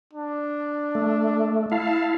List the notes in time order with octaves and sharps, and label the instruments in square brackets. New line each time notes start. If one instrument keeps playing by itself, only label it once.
[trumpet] D4
[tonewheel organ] A3
[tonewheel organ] E4 F5 [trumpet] A5